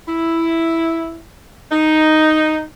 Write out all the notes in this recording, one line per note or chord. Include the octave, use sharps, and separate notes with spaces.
E4
D#4